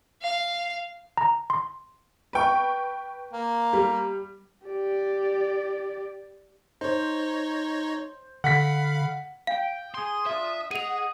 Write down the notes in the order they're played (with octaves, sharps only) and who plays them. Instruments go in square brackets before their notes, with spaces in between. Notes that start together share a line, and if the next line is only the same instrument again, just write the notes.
[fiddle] F5
[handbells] A#5
C6
[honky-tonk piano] B4 G5 C#6
[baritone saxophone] A#3
[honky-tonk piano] G3
[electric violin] G4 D5
[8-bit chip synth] D#4 C#5 [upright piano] C5
[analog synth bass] D3 [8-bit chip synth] F5 B5 [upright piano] F#5 B6
[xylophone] F5 [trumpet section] G5
[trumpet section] G#4 [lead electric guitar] C6 [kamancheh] D#6
[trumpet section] D4 F4 [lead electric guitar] E5
[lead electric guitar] G#4 [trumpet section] D#5 D#6 [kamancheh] F#5 [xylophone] D#7 F7